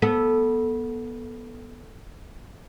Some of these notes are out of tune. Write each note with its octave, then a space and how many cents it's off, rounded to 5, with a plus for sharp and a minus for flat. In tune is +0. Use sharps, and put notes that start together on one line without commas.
B3 -20 A4 +0